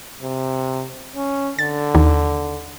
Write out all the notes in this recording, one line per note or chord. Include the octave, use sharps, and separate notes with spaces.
C3
C#4
D3 A6
D#2